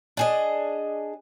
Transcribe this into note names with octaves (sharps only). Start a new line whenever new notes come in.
D4 G#4 D#5